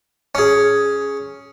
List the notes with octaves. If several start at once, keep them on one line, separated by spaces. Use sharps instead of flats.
C#4 G#4